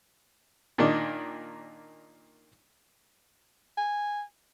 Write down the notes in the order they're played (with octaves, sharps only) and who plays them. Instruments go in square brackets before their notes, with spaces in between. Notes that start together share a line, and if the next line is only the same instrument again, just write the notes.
[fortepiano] A#2 D#3 A#3 D4 D#4
[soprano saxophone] G#5